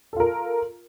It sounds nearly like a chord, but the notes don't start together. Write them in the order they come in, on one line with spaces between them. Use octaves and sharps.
A4 F4 A#4